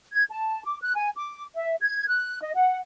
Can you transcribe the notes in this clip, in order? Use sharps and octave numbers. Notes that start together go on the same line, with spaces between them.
G#6
A5
D6
F#6
G#5
D6
E5
G#6
F#6
D#5
F#5